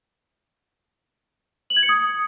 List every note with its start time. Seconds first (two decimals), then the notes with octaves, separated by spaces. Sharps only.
1.70 F#7
1.76 G#6
1.83 C#7
1.89 D#6